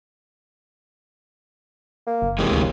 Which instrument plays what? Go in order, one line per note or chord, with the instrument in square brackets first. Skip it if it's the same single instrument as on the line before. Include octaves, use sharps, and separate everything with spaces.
[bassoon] A#3
[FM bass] F#1
[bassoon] D#2 [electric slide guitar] C3 E3 G#3
[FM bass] D2